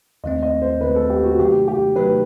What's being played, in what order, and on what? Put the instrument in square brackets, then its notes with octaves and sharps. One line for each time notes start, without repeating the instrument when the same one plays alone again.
[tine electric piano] D#2 D#3 A3 C4 [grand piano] D#5
[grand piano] D#5
C5
[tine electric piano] D#2 D#3 A3 C4 [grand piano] B4
[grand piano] A4
G4
F#4
[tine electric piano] C3 D#3 F#3 A3 D#4 [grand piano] G4
[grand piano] G4
[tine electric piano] C3 D#3 F#3 A3 D#4 [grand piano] B4